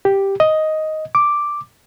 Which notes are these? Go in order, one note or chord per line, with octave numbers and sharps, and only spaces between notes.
G4
D#5
D6